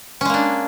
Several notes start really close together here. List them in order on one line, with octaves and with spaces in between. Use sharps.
C#4 G#3 A#3 D4